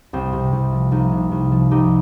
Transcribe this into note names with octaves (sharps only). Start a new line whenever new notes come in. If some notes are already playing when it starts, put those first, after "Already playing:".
C2 C4
C3
C2
F3
C2 A#3 D#4
C3
C2
F3
C2 D#4 G4